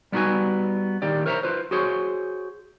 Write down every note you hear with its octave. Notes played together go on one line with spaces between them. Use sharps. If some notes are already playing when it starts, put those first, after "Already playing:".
G3 B3 D#4 F#4 B4 G#5
D#2 A2 D#3 G4 D5
A#4 C5 C#5 E5 A5 A#5
F4 B4 C5
F#4 G#4 C5 C#5